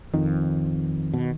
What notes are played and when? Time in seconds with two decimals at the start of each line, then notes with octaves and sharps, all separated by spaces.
0.14 F2 D#3
1.14 B2